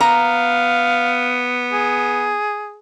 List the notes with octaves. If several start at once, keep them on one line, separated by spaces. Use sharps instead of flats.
B3 F5 A#5
G#4